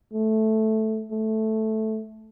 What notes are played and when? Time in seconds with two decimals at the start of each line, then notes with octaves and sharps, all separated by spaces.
0.13 A3
1.11 A3